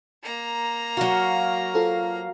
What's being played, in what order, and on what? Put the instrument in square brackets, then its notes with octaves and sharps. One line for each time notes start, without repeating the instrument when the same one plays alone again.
[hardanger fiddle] A#3 A#5
[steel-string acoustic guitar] F#3 F#4 [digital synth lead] F5
[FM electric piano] F4 A4 C5